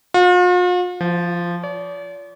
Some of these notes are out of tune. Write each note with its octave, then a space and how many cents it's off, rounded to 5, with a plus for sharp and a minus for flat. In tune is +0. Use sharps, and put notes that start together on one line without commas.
F4 +45
F3 -10
D5 -45